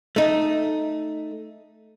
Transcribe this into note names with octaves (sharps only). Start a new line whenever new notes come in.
A3 D#4